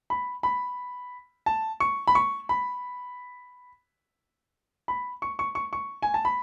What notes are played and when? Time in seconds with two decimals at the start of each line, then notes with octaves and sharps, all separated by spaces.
0.10 B5
0.43 B5
1.46 A5
1.80 C#6
2.07 B5
2.15 C#6
2.49 B5
4.88 B5
5.22 C#6
5.39 C#6
5.55 C#6
5.73 C#6
6.02 G#5
6.14 A5
6.25 B5